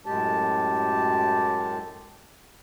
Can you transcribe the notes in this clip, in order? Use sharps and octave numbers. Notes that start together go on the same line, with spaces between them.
F#2 A2 G#3 G4 A5